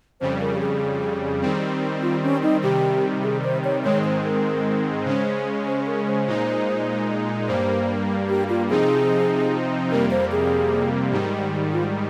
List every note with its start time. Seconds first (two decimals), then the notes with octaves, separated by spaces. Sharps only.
0.20 F2 C#3 G3 C5
0.41 A#4
0.55 G4
0.61 G#4
1.42 D#3 G3 C4
2.02 F4
2.23 C#4
2.43 D#4
2.63 C3 D#3 G3 G4
3.23 G#4
3.44 C5
3.64 C#5
3.84 G#2 D#3 G#3 C4 C#5
4.04 C5
4.24 A#4
5.05 C#3 G#3 C#4 C5
5.66 C5
5.87 A#4
6.07 C5
6.27 A#2 G#3 D#4
7.48 G2 G3 A#3 C5
8.29 G4
8.49 F4
8.69 C3 F3 C4 D#4 G#4
9.91 F2 C3 G3 A#3 A#4
10.11 C5
10.32 G#4
11.12 G#2 D#3 G3 G4
11.73 F4